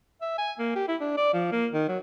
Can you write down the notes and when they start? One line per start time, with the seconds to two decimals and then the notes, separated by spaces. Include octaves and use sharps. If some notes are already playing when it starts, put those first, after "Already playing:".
0.22 E5
0.38 G#5
0.59 A#3
0.76 G4
0.88 E4
1.01 D4
1.17 D5
1.33 F3
1.52 A#3
1.72 D#3
1.89 F#3